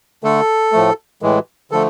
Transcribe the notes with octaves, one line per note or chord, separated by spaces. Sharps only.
D3 A3 A4
A2 F3 A3
A2 E3 G#3
D3 F3 A3 A4